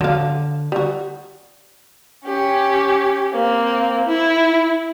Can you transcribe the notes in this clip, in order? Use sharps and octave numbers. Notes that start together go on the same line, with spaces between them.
D3 F#3 F5
G3 F#4
C#4 G4
A#3 C4
E4